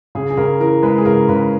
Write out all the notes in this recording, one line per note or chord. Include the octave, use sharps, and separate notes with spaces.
C#3 G#4
G#4
C#3 A#4
E3 A#4
G#3 B4
G#4
C#3 A#4
C#3 B4